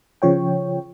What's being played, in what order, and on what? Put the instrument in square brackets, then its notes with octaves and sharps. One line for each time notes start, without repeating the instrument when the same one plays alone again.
[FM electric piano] C#3 F3 C#5 G5